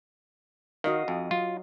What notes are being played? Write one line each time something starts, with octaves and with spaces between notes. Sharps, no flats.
D#3 F#4 D#5 F5
F2
F#3 F4